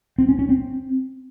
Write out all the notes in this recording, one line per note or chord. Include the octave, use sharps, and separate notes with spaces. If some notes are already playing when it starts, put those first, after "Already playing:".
C4
C#4
C#4
C4